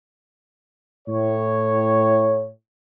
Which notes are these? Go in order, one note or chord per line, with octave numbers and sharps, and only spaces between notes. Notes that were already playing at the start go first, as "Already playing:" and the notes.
A2 C#5